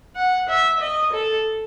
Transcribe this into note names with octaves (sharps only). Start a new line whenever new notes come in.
F#5
E5
D#5
A4